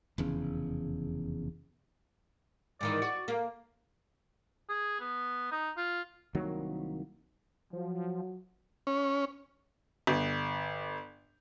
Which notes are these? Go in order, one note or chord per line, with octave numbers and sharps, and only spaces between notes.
F1 E2 C#3
G#2 D#3 E3 D5
F#4
A#3
G#4
B3
D#4
F4
C2 D#3 F#3 A#3
F3 F#3
C#4
G1